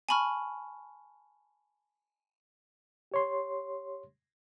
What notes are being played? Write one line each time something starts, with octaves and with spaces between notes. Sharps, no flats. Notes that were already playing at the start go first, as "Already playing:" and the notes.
G#5 A5 B5 C#6 F6
G4 C#5 C6